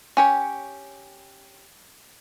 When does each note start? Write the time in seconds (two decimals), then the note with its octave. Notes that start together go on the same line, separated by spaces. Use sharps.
0.17 C#4 G4 C#5